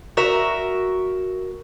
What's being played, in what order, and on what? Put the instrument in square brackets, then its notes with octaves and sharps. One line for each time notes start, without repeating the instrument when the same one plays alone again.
[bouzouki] F#4 A#4 E5